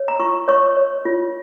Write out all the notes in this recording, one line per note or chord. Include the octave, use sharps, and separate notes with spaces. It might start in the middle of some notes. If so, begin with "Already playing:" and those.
Already playing: C#5
A#5
F4 C#6
C#5 C#6
C#5
F4